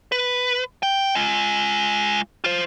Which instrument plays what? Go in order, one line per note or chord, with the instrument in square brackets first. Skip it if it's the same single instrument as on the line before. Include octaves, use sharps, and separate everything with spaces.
[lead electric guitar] B4
G5
G#3 F4
F4 C5